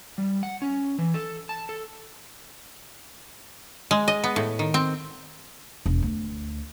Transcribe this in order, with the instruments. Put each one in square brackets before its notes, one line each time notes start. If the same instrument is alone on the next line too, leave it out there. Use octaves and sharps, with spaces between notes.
[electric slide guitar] G3
F#5
C#4
E3
A4
A5
A4
[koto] G#3
D#5
B3
A2
D#3
C4
[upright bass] E1
D2